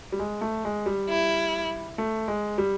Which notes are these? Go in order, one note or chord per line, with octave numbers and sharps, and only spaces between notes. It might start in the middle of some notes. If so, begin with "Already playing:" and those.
G3
G#3
A3
G#3
G3
E4
A3
G#3
G3